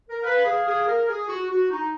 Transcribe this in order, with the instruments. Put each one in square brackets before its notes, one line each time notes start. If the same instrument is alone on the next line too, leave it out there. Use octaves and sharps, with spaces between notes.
[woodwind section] A#4
[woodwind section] B4 [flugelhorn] F5
[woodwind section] G#4
G#4
A#4
G#4
F#4
F#4
D#4